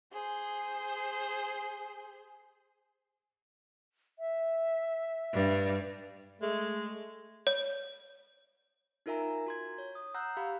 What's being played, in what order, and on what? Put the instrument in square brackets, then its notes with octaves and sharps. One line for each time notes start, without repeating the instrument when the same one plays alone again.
[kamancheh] G#4 C5
[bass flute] E5
[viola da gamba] G2
[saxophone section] G#3 A3
[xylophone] C#5
[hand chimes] D#4 F4 A#4 E5 G#5 A#5
F#4 C6 G#6
C#5
D#6
F#5 A#5 E6 F#6 G6
G4 F5 B5